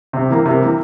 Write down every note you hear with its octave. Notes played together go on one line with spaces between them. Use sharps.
C3
E3 A#3
C3
E3 A#3